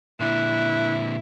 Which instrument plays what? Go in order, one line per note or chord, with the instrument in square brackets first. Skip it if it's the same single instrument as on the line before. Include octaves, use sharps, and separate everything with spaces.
[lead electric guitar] A#2 D3 [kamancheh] E4 [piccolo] F#6